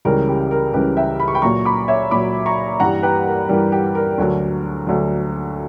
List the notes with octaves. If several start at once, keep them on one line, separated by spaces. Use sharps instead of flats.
C#2 C#3 E3 G3 A#4
G4
A#4
C#2 C#3 E3 G3 G4 B4
E5 G5
B5
C#6
G5 B5
A#2 F#3 A#5 C#6
B5 D6
C#5 E5
A#2 F#3 B5 D6
A#5 C#6
G2 E3 G3 F#5 A#5
G4 B4
A#4
G2 E3 G3 A#4
G4
A#4
D2 D3 F#3
D2 D3 F#3